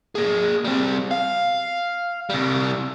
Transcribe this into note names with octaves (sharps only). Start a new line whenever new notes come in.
A#3 G#4
G3 C4
F5
C3 G3